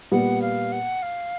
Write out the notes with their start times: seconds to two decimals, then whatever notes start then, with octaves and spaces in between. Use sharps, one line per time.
0.11 A#2 G3 B3 F#5
0.42 F5
0.72 F#5
1.02 F5